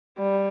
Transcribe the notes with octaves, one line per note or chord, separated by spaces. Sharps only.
G3